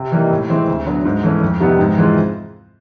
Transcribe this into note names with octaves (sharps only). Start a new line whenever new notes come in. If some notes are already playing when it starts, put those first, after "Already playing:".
Already playing: C3
E3 G3 A#3 D#4
A2
E3 G#3 C4 E4
D2
D3 F#3 B3
G#2
E3 A3 C#4
F2
C3 D#3 G3 B3
G#2
E3 G#3 C4 F4